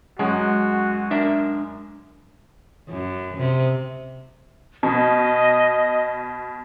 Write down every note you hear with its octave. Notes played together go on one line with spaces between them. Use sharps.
F#2 G#3 F#4
D4 A#4 E5
F#2
C3
B2 D#5